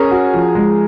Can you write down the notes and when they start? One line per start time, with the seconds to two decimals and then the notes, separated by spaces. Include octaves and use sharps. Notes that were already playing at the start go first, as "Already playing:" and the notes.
Already playing: C#4 G#4 A#4
0.11 F#4
0.34 F3
0.55 G#3